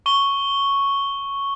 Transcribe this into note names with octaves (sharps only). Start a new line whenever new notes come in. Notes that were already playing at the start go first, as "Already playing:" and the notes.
C#6 G7